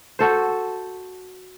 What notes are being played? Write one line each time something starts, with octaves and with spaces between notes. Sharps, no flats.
F#4 A4 C5